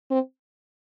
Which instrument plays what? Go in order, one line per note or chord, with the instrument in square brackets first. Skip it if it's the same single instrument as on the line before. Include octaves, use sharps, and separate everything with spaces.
[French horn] C4